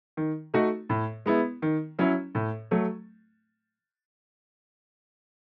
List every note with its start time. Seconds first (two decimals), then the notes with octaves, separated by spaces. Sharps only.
0.17 D#3
0.54 A3 D#4 F#4
0.89 A2
1.26 G#3 B3 E4
1.62 D#3
1.99 F#3 C#4 E4
2.35 A2
2.71 F#3 A3